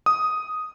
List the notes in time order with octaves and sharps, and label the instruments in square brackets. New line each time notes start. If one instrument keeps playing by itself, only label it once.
[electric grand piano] D#6